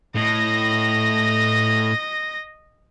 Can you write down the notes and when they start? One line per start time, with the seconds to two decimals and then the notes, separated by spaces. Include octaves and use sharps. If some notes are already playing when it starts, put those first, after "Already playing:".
0.16 A2 D#5 A#6